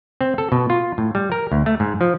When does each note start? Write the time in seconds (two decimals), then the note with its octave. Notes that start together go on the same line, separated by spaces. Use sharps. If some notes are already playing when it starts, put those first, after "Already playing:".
0.21 C4
0.38 A4
0.52 B2
0.70 F4
0.98 A2
1.15 G3
1.32 A#4
1.52 D2
1.66 A3
1.80 G#2
2.01 F3